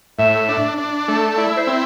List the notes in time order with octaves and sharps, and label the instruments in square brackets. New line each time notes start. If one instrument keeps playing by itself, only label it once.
[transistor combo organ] A2 [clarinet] E5
[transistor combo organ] D4
D4
A3
[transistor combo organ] E4 [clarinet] D5
[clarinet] C5
[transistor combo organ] C4